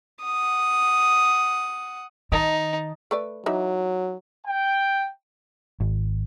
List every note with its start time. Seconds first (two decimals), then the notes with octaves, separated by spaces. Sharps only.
0.23 F#5 D#6
2.32 D#3 D#4 D#5 A5
3.11 A3 B4 D5
3.46 E3 F#3 D#4 E5
4.46 G5
5.80 G#1